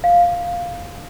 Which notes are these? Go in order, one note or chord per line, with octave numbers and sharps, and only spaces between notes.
F5